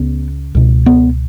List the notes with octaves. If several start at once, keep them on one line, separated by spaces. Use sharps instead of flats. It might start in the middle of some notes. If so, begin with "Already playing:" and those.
Already playing: C#2 C#3 B3
C#2 B2
B3